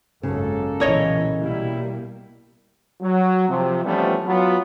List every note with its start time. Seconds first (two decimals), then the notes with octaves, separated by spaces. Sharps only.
0.23 G#1 F#2 C#3 A#3 A4
0.80 B1 A#2 E3 A#4 C#5 D#5
1.41 B2 G3 A#3 E4
3.01 F#3
3.49 C3 F3
3.85 E3 F3 G3 A3 B3 C#4
4.26 F#3 B3 F4